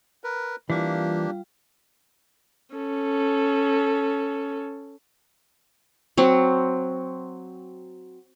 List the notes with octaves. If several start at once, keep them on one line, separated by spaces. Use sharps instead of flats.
A#4 B4
E3 G3 A#3 D4 F4 G4 F5
C#4 A4
F#3 C4